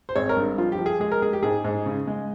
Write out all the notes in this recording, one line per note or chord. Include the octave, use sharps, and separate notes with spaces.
C5
G#1 C#5
A#4
G2
F3 F4
G4
F3
G#4
G#3 G#4
A#4
G#3 G#4
G4
G#2 G#4
G#2
C#3
G#3